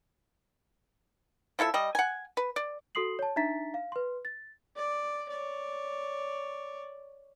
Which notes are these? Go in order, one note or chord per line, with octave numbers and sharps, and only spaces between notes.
F3 E4 A4 E5
G3 D#5
F#5 G#5
B4
D5
F#4 A4 C6 D#6 C7 F#7
C#5 A5
D4 D#4 E5 A#5 A6 B6
F5
B4 C6
A6
D5
C#5 D5